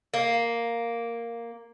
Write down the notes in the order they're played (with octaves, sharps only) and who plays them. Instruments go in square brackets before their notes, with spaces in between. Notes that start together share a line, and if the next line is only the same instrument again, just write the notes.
[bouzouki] A#3